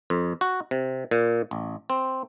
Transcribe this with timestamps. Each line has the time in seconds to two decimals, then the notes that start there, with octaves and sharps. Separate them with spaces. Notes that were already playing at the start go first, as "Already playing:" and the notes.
0.10 F2
0.41 F#4
0.71 C3
1.11 A#2
1.51 A1
1.90 C4